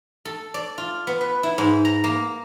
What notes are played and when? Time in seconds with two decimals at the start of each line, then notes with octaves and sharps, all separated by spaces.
0.25 A4
0.54 D5
0.78 F4
1.07 B3
1.21 B4
1.43 E4
1.58 G#2
1.85 A#5
2.04 A#3